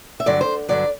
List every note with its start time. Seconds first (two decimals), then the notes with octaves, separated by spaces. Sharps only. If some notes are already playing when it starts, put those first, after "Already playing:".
0.20 E5
0.26 G2 D3 F#3 D5
0.41 C5
0.69 G2 D3 F#3 D5